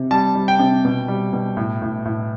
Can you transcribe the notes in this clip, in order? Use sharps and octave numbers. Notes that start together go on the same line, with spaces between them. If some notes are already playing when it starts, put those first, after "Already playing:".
Already playing: C3
G3 A5
G3
G5
C3
B2
G3
B2
A2
A2
A2